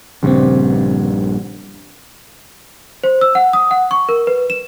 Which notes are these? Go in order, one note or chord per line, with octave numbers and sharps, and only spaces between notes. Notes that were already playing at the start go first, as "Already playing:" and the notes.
A#1 G2 C#3 C4
C5
E6
F#5
D#6
F#5
C#6
A#4
B4
E7